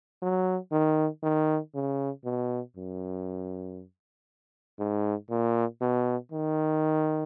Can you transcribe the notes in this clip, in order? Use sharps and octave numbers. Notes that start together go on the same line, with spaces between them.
F#3
D#3
D#3
C#3
B2
F#2
G#2
A#2
B2
D#3